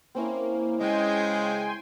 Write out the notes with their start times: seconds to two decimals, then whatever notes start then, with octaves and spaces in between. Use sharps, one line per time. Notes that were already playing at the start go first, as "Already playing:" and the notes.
0.15 A#3 C4 C#4 E4
0.80 C#3 G#3 G5 G#5 C6